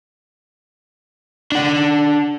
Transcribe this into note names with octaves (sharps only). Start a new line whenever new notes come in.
D4 F#5